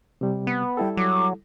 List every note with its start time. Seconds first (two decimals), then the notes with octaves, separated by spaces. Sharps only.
0.21 C3 G3
0.47 B3
0.77 G3 E4 A4 G5
0.97 F#3 D6